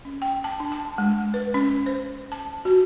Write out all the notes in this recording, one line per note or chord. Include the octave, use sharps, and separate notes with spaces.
C#4
G5
A5
D4
A5
G#3
B4
C#4
C5
A5
F#4